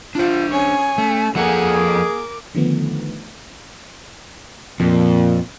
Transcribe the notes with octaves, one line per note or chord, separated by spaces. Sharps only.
D4 F4 C5
C#4 C#5 G#5
A3 C#4
F3 A#3 F4 G#4 A4 F#5 G#5
A#4 D6
D3 D#3 F3 A3 B3
F2 A#2